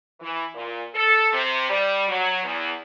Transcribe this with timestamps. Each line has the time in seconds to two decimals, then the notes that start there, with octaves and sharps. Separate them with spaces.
0.20 E3
0.55 A#2
0.94 A4
1.33 C3
1.69 G3
2.08 F#3
2.44 E2